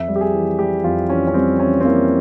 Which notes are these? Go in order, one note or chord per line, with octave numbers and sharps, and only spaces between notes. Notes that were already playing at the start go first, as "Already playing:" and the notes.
Already playing: F2 E5
G3
G4
G#4
E3
G3 G4
F2 F4
E3 C#4
C#4
G3 C4
E3 C#4
C4
E3 A#3